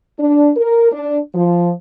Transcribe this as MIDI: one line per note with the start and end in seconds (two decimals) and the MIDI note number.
0.19 0.50 62
0.57 0.88 70
0.92 1.19 62
1.35 1.71 53